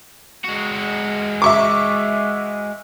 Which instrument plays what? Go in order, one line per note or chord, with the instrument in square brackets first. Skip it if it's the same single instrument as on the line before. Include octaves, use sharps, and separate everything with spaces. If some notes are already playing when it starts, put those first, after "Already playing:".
[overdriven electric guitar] G#3 F#4
[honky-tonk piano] E5 C#6 D6